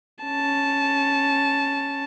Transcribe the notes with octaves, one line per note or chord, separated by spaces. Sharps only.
C#4 A5